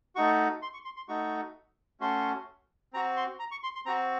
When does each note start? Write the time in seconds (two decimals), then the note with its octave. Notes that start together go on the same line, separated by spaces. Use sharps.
0.16 A3 D#4 F#4 C#6
0.62 C6
0.73 C#6
0.85 C6
0.96 C6
1.08 A3 D#4 F#4 C#6
2.00 A3 C#4 F#4 C6
2.93 C4 F#4 A#5
3.17 C6
3.40 A#5
3.51 C#6
3.63 C6
3.75 C6
3.86 C4 F#4 A#5